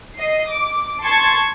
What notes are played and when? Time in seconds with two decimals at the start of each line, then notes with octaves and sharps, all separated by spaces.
0.18 D#5 C7
0.49 D6
1.03 A5 C6 C#6 G#6